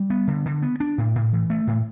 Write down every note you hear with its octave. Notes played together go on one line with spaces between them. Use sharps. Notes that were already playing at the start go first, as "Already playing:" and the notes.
Already playing: G3
B3
D3
D3
B3
D4
A2
A2
E3
A3
A2